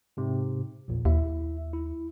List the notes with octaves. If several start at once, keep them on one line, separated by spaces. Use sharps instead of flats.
G#2 C3
A#1 E2 A#2
D#2 E4 E5
E4